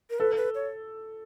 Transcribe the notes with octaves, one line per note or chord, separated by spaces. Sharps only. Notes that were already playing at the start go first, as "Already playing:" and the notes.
A#4
A4 B4
B4
C#5